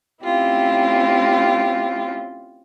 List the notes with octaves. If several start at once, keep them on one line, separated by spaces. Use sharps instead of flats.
A3 C4 C#4 E4 F4 G4